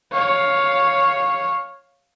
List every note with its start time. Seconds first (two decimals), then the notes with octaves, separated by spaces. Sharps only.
0.12 C#5 F5